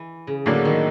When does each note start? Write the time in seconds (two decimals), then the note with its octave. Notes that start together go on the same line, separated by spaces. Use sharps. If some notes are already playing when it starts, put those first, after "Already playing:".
Already playing: E3
0.27 C#3
0.46 A2 D3 F#3 A#3 D4
0.65 D#3